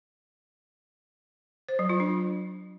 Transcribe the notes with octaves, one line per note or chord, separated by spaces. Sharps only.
C5
F#3
F4
D4